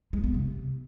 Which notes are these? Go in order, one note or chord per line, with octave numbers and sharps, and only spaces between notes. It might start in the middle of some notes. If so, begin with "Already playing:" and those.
G#3
B3
C3